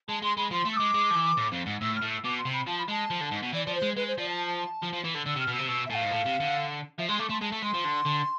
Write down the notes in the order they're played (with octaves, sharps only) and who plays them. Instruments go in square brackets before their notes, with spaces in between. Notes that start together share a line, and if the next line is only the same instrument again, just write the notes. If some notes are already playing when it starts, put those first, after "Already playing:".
[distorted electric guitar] G#3 [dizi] A5
[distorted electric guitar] G#3 [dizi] C6
[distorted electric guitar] G#3 [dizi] B5
[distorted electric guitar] F3 [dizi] C6
[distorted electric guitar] A3
[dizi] E6
[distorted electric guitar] G#3 [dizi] D6
[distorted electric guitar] G#3
F3
E3
A2
F2
G#2
[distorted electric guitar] A2 [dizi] E6
[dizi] F6
[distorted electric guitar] A2
[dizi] E6
[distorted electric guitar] B2 [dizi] D6
[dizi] C6
[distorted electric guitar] C3
[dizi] B5
[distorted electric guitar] F3 [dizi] A5
[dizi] B5
[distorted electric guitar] G#3 [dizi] A5
[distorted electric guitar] F3
D3
G#2
B2
[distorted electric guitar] E3 [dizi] D5
[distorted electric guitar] F3 [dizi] D5
[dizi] C5
[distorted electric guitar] G#3
[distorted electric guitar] G#3 [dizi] B4
[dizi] C5
[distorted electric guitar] F3 [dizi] D5
[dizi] A5
[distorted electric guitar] F3
F3
E3
D3
[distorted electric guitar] D3 [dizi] E6
[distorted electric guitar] C3
[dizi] F6
[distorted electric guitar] B2 [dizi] E6
[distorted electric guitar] C3
[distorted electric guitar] B2 [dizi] E6
[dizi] E5
[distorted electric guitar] A2 [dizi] G#5
[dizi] F5
[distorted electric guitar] G#2
A2
C3
D3
[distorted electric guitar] F3 [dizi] E5
[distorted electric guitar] G#3 [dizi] C6
[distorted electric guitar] A3 [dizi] D6
[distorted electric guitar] A3 [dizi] C6
[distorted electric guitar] G#3 [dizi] A5
[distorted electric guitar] A3
[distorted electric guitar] G#3 [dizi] C6
[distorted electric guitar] F3
D3
D3